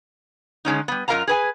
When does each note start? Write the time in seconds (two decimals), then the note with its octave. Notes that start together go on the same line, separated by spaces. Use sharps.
0.65 D3 G#3 C#4 D#4
0.88 G3 B3
1.08 F#2 F4 A#4 D#5 F5 A#5
1.27 G#4 B4 G#5